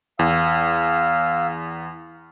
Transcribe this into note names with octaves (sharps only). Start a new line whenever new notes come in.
E2 F5 E6